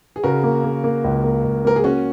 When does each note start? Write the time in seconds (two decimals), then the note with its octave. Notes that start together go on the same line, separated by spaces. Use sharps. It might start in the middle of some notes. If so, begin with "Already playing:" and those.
0.16 G#4
0.23 C#3 F#4 A#4
0.44 A#3
0.64 A#3
0.84 A#3
1.04 C#2
1.24 A#3
1.44 C#2
1.65 A#3 A#4
1.76 G#4
1.84 A#3 C#4 F#4